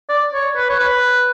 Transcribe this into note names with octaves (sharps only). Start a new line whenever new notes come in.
D5
C#5
B4
C#5
B4